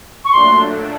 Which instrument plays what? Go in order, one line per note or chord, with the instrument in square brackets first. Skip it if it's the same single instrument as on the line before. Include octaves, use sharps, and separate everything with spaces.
[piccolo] C#6
[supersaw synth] A#2 F#3 A3 D4 [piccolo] C6